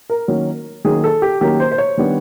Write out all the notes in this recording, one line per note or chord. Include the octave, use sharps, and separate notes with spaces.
A#4
D#3 F#3 A#3 C#4
D#3 F#3 A#3 C#4 G#4
A4
G4
D#3 F#3 A#3 C#4 G4
C5
C5
C#5
D#3 G3 B3 D4